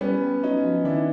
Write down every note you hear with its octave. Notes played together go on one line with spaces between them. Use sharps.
G3 B3 C#4
G3
F#3 C#4 D#4
F3
D#3 D4 E4